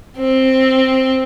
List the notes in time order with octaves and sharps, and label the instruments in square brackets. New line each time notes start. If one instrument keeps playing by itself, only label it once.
[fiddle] C4